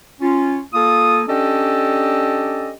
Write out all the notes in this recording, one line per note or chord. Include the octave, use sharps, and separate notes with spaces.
C#4 F4
A#3 F4 A4 D#6
C#4 D4 G4 A4 D5 D#5